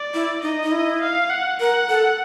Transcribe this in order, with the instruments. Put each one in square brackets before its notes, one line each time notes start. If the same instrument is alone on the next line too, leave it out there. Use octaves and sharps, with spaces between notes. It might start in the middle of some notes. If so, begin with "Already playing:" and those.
Already playing: [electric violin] D5
[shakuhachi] E4
[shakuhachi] D#4 [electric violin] D#5
[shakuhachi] D#4
E4
[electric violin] F5
F#5
[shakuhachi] A#4 [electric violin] F#5
[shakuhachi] A4